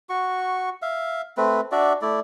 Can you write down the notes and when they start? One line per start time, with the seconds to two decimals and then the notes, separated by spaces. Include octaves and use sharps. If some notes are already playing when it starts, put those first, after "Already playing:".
0.09 F#4 C#6
0.82 E5 F5
1.37 A3 C4 B4
1.72 D4 F#4 D5 E5
2.02 A3 E4 D5